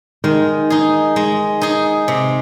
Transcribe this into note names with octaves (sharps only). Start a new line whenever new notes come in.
D#3 G#3
D#4 G#4
G#3
D#4 G#4
C3